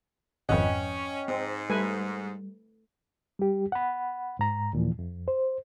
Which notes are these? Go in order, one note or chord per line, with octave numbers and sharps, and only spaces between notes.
G#1 F2 C#4 B4 D#5 F#5 G5
G#2 C4
G3 A3 B4 G#5
G3 G4
F#5 B5
G#2 A#5
D#2 A#2 E3 F3
F2
C5